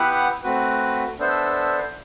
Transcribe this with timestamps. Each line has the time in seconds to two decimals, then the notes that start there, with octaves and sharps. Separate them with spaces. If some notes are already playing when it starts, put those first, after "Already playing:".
Already playing: B3 E4 G4 B4 F#5
0.43 A3 C4 F#4 B4
1.19 B3 D4 A4 C5 E5